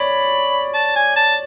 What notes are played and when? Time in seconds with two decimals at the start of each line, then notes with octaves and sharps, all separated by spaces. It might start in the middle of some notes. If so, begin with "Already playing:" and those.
Already playing: C#5 D5 B5
0.74 A5
0.96 G#5
1.16 A5